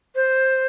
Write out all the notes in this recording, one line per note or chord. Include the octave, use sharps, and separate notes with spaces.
C5